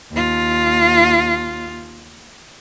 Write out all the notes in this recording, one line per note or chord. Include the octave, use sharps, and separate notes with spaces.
D#2 F4